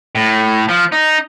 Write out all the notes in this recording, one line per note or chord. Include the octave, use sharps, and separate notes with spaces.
A2
F3
D#4